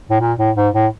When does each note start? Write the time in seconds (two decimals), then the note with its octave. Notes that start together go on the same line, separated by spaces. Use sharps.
0.11 A2
0.20 A#2
0.38 A2
0.56 G#2
0.74 A2